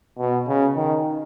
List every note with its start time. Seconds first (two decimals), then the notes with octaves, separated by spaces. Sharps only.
0.19 B2
0.48 C#3
0.76 D#3